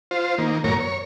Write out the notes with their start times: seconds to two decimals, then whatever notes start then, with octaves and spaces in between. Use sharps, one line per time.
0.11 F4 C5
0.38 D#3 A#3
0.64 F#2 A2 A#3 A#4 C#5
0.80 C#5